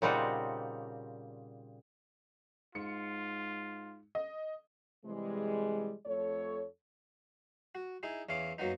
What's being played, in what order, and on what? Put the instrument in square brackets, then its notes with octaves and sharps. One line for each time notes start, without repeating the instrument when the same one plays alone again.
[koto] A#2 C#3 G3 C4 D#4 F#4
[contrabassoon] G#2 [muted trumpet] F4 [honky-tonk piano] C#7
[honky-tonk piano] D#5
[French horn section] C3 E3 G3 G#3
F2 A3 A4 C#5
[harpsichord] F#4
D#4 E4 G#4
E2 C#4 E4 F5 D6
F#2 F#3 A#3 B3 D#4